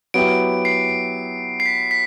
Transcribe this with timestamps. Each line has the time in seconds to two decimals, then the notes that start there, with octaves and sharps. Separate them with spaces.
0.14 F#3 B3 E4 G4 D7
0.65 C7
1.60 C7
1.66 B6
1.91 B6